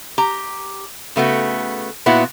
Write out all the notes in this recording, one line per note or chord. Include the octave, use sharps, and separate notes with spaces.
G4 A#5
C#3 A3 B3 F#4
A#2 B3 E4 F#4